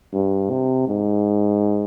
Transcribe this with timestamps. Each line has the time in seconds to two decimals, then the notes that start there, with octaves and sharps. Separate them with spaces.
0.13 G2
0.50 C3
0.88 G#2